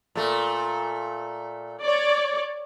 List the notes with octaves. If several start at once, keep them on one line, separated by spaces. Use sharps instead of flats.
A#2 A3
C#5 D5